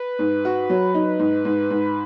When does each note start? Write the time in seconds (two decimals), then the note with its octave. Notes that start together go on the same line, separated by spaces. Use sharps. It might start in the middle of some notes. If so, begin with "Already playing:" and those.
Already playing: B4
0.19 G#2
0.45 F#4
0.70 F#3
0.94 D#4
1.19 G#2
1.45 G#2
1.70 G#2